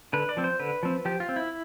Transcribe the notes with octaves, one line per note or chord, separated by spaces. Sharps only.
D3 B4
D5
F3 C4
C5
D3 B4
F3 C4
F3 G4
F4
C4
E4